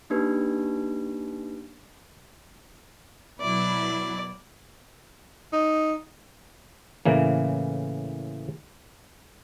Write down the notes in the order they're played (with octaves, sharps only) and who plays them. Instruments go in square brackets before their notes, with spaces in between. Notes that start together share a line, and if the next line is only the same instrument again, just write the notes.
[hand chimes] A#3 D4 D#4 G4 B4
[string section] B2 F#3 E4 [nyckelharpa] D5
[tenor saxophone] D#4
[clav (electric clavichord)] A2 C#3 E3 A#3